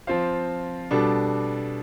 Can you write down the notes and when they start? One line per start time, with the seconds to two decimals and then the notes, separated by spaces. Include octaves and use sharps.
0.07 F3 C4 F4 C5 F5
0.91 B2 G3 D4 A4